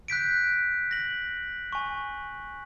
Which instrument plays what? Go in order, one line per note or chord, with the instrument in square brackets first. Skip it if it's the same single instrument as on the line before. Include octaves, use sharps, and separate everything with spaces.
[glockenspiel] F#6 G6 B6 D7
A#6 F#7
G#5 C#6